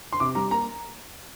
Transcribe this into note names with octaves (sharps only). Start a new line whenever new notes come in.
C6
C3 D6
G3 A#5
A#3 A#5